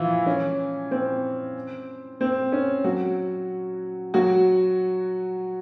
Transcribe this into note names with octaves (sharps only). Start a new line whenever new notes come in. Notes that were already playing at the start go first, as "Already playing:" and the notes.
Already playing: E3 F3 E4 F4
C#4
C4
C4
C#4
F#3 F#4
F#3 F#4